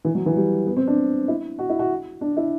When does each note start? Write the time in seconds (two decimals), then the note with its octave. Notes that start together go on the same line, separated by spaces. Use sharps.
0.05 E3
0.15 F#3
0.26 E3
0.36 G3
0.66 B3
0.77 C4
0.87 D4
1.28 E4
1.59 F#4
1.69 E4
1.79 F#4
2.21 D4
2.37 E4